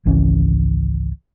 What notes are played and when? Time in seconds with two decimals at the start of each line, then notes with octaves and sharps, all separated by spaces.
0.06 G#1 C#2 E3 C#4